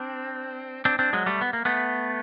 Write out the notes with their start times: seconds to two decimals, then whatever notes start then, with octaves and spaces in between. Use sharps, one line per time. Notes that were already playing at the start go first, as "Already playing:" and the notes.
Already playing: C4 D4
0.85 C4 D4
0.99 C4 D4
1.13 F#3 G#3
1.26 G3 A3
1.41 B3
1.53 A#3
1.65 A3 B3